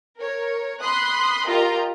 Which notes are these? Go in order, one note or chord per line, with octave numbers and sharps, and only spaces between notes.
A#4 C#5
B5 C6 D#6 F#6
F4 G4 A#4 D#5 A#5